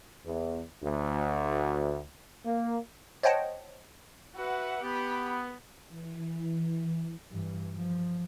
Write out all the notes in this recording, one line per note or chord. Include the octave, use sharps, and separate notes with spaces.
E2
D2
A#3
C5 C#5 D#5 F#5 G5 A5
F#4 B4 E5 F#5
B3 G4 B5
E3
G2 E3
F3